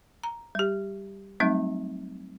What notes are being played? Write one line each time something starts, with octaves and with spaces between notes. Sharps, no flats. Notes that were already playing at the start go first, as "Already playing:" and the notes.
A#5
G3 G4
F#3 G3 A3 C4 D#4